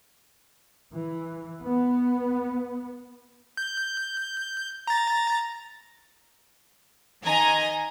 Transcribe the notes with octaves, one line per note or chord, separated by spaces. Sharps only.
E3
B3
G6
A#5 A6
D#3 D#5 G#5 A#5